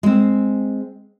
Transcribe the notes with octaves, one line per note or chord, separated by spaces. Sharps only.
G#3 C4